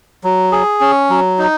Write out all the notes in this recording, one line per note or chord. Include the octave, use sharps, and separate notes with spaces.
F#3
G#4
C#4
F#3
D#4